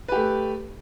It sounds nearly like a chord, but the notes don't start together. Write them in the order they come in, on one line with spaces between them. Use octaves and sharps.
B4 G4 A3